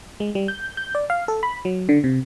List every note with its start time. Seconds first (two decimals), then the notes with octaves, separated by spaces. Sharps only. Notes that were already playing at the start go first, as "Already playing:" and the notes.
0.20 G#3
0.35 G3
0.48 G6
0.77 G6
0.95 D5
1.10 F5
1.28 A4
1.43 B5
1.65 F#3
1.89 D3
2.04 C3